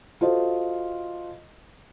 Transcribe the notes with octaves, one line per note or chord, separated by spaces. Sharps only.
F4 F#4 A4 C5 D#5